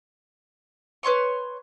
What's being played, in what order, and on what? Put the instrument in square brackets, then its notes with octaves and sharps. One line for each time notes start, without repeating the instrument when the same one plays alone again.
[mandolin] B4 C#5 C6 C#6